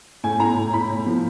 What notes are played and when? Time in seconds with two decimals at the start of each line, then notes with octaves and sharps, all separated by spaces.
0.23 A2 G#5
0.40 A2 A#5
0.57 A2
0.73 A2 B5
0.89 A2
1.06 F3